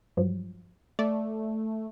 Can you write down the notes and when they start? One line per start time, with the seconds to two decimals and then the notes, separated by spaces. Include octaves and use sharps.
0.17 G2 F3 F#3
0.99 A3 D5